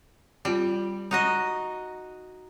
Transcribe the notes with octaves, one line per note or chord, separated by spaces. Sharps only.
G3 C4 F4
D#4 F#4 D#5